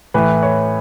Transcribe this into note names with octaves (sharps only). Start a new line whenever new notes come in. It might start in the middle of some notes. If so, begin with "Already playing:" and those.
A2 E3 B4
C#5